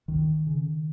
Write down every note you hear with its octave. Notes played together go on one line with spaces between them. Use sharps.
C#2 D#3
C#3